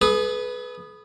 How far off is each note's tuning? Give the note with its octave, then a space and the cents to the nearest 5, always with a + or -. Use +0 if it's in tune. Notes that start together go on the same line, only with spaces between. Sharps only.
G#4 +45 B4 +0 D#6 -15